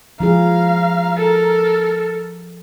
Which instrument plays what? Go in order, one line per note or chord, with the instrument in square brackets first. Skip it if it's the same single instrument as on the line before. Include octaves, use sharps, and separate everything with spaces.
[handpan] F3 E4 G#4 [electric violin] F5 [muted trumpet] A#5
[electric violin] A4 A#4